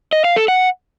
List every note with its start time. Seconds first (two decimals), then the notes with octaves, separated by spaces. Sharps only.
0.13 D#5
0.24 F5
0.36 A4
0.48 F#5